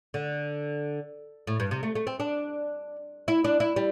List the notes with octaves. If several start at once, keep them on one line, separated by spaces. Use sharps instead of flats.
D3
A2
G2
C3
A3
A3
C4
D4
E4
D4
E4
G3